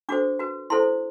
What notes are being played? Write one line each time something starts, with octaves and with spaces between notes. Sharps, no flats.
D4 F#4 A4 C5 D6
F#4 B4
E4 A4 C5 C6